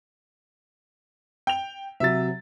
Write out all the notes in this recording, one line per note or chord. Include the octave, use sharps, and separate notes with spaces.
G5 F7
C3 F#3 E5 A6